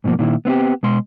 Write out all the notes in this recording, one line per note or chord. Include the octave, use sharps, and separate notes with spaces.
G#2 B2 E3 F3 A#3
A#2 D#3 E4
B3 C4 E4 G4
B2 G#3 C6